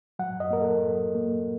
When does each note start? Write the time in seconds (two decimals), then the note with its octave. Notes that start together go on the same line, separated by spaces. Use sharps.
0.19 F#3 F#5
0.40 D#5
0.51 A#3 A#4
0.61 A4
0.83 F#3
1.15 A#3